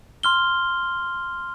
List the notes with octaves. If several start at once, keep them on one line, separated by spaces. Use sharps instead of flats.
C6 F6 G7